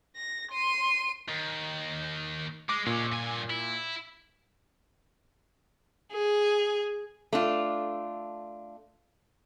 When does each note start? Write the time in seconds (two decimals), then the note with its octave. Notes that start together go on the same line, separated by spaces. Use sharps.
0.16 A#6
0.51 C6 D#7
1.29 D#2
2.69 G#3 D6
2.86 A#2 G#3 C#4
3.12 G2 G#5
3.50 E4
6.13 G#4
7.33 A3 D4 F4